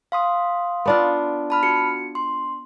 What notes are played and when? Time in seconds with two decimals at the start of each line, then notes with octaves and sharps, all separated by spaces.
0.12 F5 C6 D#6
0.86 B3 D4 F4
1.50 A5 B5 F6
1.63 F#4 C#7
2.15 C6